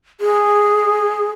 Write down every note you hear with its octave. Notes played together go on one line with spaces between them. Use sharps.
G#4